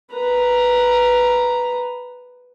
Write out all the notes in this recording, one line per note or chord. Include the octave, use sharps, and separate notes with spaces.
B4 A#5